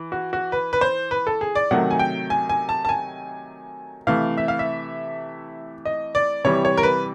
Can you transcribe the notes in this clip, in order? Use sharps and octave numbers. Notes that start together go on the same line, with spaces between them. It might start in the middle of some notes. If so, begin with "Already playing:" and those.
Already playing: E3
F#4
F#4
B4
B4
C5
B4
A4
G#4
D5
C3 D#3 F#3 A3 F#5
G#5
G5
G#5
G#5
A5
A5
G#5
C3 E3 A3 F5
E5
F5
E5
D#5
D5
C3 E3 G3 C#5
C#5
A#4
B4